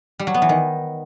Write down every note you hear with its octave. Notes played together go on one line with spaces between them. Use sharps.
G3
F#3
B3
E3
D#3